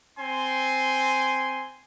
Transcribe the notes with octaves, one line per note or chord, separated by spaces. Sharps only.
C4 G#5 C6